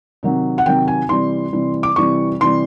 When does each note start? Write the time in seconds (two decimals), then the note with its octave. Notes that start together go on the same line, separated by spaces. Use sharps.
0.23 C3 D#3 F#3
0.58 F#5
0.66 C3 D#3 F#3 G5
0.88 G#5
1.09 C3 E3 G3 C6
1.53 C3 E3 G3
1.83 D6
1.96 C3 E3 G3 C#6
2.40 C3 E3 G3 C6